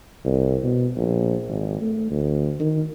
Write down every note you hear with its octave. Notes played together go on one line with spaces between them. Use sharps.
C2
B2
A#1
G#1
A3
D2
D#3